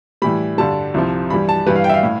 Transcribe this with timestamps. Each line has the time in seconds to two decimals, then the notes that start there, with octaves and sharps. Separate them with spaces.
0.22 A2 E3 G3 B5
0.58 G2 D3 G3 A5
0.94 C2 C3 F3
1.30 G2 E3 G3 B5
1.49 A5
1.67 G2 E3 G3 B4
1.76 F5
1.84 G5
1.89 E5
1.94 F5
2.03 A2